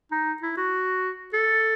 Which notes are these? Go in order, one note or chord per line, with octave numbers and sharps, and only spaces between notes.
D#4
E4
F#4
A4